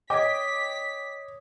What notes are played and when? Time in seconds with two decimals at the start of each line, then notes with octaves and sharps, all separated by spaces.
0.10 C#5 D#5 G5 D6 D#6 G#6 B6